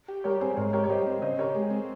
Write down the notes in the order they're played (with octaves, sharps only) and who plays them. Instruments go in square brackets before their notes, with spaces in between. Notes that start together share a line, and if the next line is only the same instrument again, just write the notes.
[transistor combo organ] G4
[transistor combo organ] G3 [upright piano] A#4 C#5
[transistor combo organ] C4 [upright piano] G#4 C5
[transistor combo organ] G#2 [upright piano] A#4 C#5
[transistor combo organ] G4 [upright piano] A#4 C#5
[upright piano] C#5
[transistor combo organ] G3 [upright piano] C5 D#5
[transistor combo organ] C4
[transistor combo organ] C#3 [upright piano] C5 D#5
[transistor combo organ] G4 [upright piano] A#4 C#5
[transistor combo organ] G#3
C4